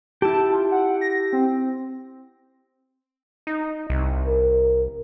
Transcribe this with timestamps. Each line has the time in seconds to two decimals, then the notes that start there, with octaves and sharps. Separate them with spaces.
0.22 E4 G4 A5
0.52 F4
0.72 F#5
1.01 A#6
1.33 C4
3.47 D#4
3.90 C2
4.27 A#4